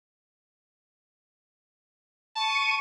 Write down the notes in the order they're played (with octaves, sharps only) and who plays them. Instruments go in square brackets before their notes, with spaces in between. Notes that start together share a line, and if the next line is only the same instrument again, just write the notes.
[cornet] A5 [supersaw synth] C#6 D#7